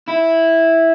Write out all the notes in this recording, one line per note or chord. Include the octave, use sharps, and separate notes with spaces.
E4